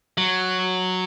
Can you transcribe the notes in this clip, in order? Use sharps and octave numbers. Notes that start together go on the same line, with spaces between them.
F#3